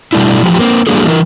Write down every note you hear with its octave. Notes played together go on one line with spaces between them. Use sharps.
B2 G3 A3 D4 E4
E3 F3 G4
A#3 C4
F#3 G3 A#3 D4 G#4 A4
E3 A#4